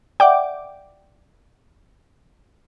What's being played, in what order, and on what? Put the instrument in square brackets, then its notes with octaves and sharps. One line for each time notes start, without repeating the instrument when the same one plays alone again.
[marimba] D5 E5 F#5 [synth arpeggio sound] G5 D6